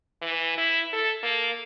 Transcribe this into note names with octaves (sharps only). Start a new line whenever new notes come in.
E3
E4
A4
A#3